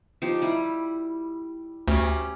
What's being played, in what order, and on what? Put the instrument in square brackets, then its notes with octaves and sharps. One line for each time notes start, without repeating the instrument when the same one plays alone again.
[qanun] F3 D#4 G4
G3 E4
[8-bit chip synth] D2 [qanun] C#4 G4